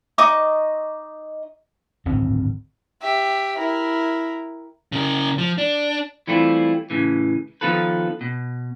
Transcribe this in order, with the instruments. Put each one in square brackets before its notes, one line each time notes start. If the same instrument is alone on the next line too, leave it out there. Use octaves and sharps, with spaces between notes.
[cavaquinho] D#4 D#5 C#6 D6
[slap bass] D1 G#1 G2 C4
[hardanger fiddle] G4 E5
E4 A#4
[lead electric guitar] C#3 A#4
F3
D4
[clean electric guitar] E3 G3 A3 C4 E4 F4
A2 C#3 E3
D#3 F3 B3 F4 A4 B4
B2